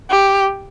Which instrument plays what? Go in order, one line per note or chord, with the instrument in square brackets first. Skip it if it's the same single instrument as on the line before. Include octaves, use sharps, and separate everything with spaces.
[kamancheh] G4